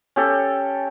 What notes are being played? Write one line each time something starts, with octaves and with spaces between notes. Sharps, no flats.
C#4 G4 A4